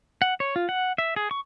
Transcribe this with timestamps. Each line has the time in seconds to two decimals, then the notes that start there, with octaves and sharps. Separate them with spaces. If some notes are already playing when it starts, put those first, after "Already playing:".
0.22 F#5
0.40 C#5
0.56 F4
0.69 F#5
0.98 E5
1.16 G#4
1.31 C#6